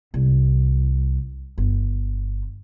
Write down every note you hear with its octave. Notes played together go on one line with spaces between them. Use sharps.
C2
G1